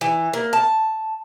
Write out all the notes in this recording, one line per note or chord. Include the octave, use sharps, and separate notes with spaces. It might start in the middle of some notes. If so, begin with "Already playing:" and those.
E3
A#3
A5